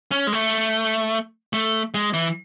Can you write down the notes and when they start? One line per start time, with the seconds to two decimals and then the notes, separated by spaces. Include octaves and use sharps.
0.11 C#4
0.27 G#3
0.33 A3
1.53 A3
1.94 G#3
2.13 E3